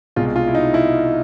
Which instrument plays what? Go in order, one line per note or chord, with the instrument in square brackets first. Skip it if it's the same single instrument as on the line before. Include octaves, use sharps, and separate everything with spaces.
[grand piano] C2 B2 G#3 F4
F4
E4
D#4
E4